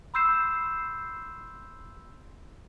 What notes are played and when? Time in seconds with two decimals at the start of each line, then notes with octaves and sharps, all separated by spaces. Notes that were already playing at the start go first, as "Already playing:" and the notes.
0.14 B5 C6 E6 G6 C7 E7